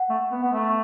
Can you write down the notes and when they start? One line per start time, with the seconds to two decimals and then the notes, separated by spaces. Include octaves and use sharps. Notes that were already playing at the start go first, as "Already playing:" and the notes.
Already playing: F#5
0.09 A3
0.31 B3
0.42 B3
0.52 A3